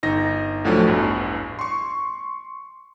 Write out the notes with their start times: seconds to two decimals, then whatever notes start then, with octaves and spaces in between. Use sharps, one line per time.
0.03 G1 D#4 A#6
0.65 D2 A2 D3 F3 F#3 A3
0.87 A1 E2 G2
1.59 C6 C#6